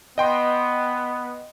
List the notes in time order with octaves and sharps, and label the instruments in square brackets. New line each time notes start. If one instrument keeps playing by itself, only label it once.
[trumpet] B3 [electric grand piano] D#5 G5 C6